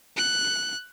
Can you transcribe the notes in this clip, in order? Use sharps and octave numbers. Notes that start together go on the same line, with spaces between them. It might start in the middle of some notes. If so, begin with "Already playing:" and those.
F#6